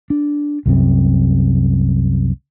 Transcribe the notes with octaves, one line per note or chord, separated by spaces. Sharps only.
D4
C2 F#2 C3